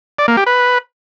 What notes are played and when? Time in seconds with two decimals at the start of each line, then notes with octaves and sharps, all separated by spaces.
0.19 D5
0.28 A#3
0.37 G4
0.46 B4